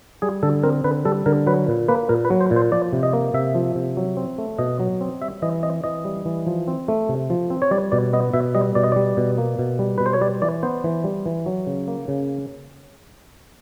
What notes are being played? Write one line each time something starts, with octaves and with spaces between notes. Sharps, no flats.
G3 G#4
D3 A4
C4 A#4
D3 B4
G3 A4
D3 A#4
F#3 B4
A#2
A#3 B4
A#2 A#4
B4
F#3
C5
A#2
C5
F3 D5
C3
D#5
A#3
C3 E5
F3
C3
F#3
C4
A3
B2 D#5
F#3
C4
G3 E5
E3 D#5
C4 D#5
E3 D#5
G3
E3
F3
C4
A3
C3
F3
C4
C#5
G3 D5
B2 D5
B3 D#5
B2 E5
G3 D#5
B2 D5
D#5
G3 D5
B2
A#3
B2
G3
B2 B4
C5
C#5
G3 D5
E3 D5
B3 C5
E3
G3
E3
F#3
C#3
A#3
C#3